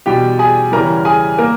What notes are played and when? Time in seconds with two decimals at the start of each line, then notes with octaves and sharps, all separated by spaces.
0.06 E2 B2 G3 G4 G5
0.39 G#4 G#5
0.72 E2 C#3 E3 G3 A#4 A#5
1.05 G#4 G#5
1.38 A#3 A#4